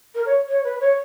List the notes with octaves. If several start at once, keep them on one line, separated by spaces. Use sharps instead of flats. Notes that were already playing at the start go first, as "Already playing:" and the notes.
A#4
C#5
C#5
B4
C#5